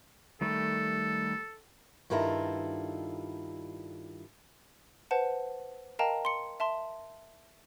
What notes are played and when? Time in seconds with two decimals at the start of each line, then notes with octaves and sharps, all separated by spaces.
0.41 D#3 G3 A3 A4
2.10 G2 D#3 E4 F4 A4 A#5
5.11 B4 C5 F#5 A5
5.99 A#4 D#5 F5 G5 A5 A#5
6.25 C6 C#7
6.60 E5 A5 C6